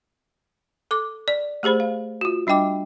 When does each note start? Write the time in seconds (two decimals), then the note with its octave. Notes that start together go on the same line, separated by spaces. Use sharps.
0.91 A4 D6
1.28 D5
1.63 A3 G4 G#4 C5 B5
1.80 F5
2.21 F4 F#4
2.47 G3 D4 D#5 G5 D6